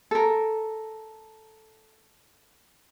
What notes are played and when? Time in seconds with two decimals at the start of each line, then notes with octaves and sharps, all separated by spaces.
0.11 A4 A#4